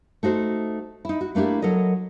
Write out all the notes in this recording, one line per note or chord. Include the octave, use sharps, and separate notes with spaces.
A3 D#4 F#4 C5
D#4 E4
F#4
A3 A#3 D4 E4 G4
F#3 A4 A#4 D#5